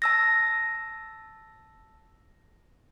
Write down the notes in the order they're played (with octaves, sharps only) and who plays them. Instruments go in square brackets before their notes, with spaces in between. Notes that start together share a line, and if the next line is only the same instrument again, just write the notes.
[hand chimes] A5 E6 A#6